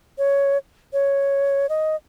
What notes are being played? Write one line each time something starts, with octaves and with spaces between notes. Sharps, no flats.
C#5
C#5
D#5